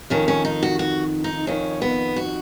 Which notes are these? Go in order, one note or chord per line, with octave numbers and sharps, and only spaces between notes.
F2 D#3 C#4
C#4
D#4
F#4
F#4
D#4
F2 D#3 C#4
B3
F#4